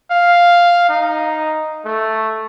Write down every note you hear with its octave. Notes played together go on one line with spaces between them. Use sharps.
F5
D#4
A3